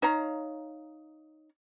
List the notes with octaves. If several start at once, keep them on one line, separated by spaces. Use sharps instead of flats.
D#4 C#5 F5 A#5